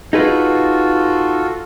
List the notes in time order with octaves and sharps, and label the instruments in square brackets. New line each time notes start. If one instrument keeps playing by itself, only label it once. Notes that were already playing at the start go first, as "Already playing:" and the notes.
[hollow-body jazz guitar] D#4 G#4 B4 [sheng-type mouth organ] F4 F#4 A4